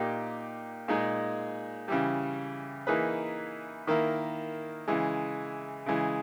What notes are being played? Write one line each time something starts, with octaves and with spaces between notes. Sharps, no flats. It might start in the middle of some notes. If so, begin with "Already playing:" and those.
Already playing: A#2 A#3 D#4 G4
A#2 G#3 D#4 G#4
C#3 E3 G3
E3 A#3 D#4 G#4 B4
D#3 A#3 E4
C#3 E3 G#3
C#3 E3 G#3